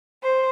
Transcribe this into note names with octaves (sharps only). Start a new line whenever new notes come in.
C5